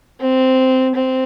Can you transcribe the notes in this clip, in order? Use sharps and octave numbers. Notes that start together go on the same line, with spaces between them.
C4
C4